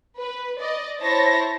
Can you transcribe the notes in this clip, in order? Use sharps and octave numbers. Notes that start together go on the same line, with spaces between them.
B4
D5 D#5
E4 C5 C#5 A5 A#6